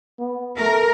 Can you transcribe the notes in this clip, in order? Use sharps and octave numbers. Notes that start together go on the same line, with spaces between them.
B3
A3 A#4